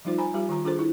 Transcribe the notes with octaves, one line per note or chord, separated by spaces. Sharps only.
F3 G3 D#4 F4 C5
C5 G#5 A#5 B5
G3 F4 G4
D#3 F4 A#5
D4 F4 G#4 A4 C5
E4